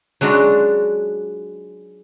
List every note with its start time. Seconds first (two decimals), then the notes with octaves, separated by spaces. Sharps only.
0.21 F#3 G#3 D4 F4 F#4